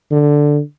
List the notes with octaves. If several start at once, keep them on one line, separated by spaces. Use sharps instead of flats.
D3